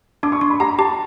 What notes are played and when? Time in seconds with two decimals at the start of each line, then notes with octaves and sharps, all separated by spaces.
0.23 D4 D6
0.32 C#6
0.41 D4 C6
0.50 B5
0.60 G4 A#5
0.79 G4 A5